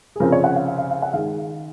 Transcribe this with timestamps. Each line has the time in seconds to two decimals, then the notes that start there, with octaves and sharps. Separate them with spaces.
0.16 G#4
0.20 C#3 F3 C4 A#4
0.32 C#5
0.44 F#5
0.56 F5
0.67 F5
0.78 F5
0.91 F5
1.02 F#5
1.13 D#3 G#3 D#4 F5